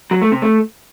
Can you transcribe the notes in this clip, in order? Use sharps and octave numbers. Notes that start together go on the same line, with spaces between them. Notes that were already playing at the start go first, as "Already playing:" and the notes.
F#3
A3
C3
A3